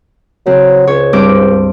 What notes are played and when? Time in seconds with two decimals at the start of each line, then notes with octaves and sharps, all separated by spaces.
0.46 C#3 F#3 C4
0.87 C#2 C#5
1.13 G2 C4 D6